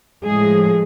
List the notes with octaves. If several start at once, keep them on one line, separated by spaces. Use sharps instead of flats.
A2 F3 G#3 G#4